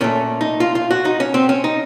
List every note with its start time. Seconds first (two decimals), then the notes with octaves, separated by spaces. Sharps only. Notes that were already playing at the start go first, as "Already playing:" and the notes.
0.01 A#2 A3 C#4
0.41 D#4
0.60 F4
0.75 F4
0.91 F#4
1.05 D#4
1.20 C#4
1.34 C4
1.49 C#4
1.64 D#4